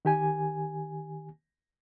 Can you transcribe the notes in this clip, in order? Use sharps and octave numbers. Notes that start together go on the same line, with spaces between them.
D#3 G4 G#5